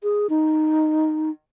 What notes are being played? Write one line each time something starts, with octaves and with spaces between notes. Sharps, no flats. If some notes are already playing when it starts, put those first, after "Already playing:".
G#4
D#4